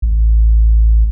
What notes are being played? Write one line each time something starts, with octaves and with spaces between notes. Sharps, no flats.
A1